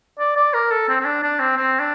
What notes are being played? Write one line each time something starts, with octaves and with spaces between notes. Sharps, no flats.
D5
D5
A#4
A4
C4
C4
D4
D4
C4
C4
D4